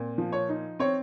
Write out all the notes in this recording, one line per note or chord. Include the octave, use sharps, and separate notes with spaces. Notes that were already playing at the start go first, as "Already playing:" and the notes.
Already playing: A#2 C4
F3
C#5
D#4
C4 C#5